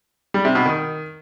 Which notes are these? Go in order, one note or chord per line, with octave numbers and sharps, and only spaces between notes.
G3
C3
B2
D#3